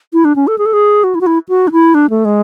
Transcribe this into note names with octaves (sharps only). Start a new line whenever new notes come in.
E4
D4
C#4
A4
G#4
A4
G#4
F#4
E4
F#4
E4
F#4
D4
E4
D4
A3
G#3